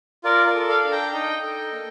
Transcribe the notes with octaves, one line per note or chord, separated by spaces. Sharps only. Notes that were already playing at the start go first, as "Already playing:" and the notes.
F4 A#4 D5
A#4 D5
A4
D5 F5
D4
G5 A#5
D#4 D#5 G5
A4
A#3